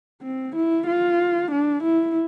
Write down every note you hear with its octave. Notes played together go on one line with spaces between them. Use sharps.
C4
E4
F4
D4
E4